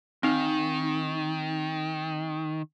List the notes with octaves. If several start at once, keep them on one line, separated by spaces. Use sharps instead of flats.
D#3 C4 D#4